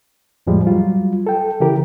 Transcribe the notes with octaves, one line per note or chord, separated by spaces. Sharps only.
F2 A2 F3 G3 G#3
F#3 G3 F4
A4 G5
C#3 E3 G4 A#4